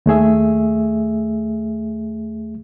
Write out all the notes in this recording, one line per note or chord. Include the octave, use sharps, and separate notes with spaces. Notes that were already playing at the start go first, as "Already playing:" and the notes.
D#2 A3 G#4 E5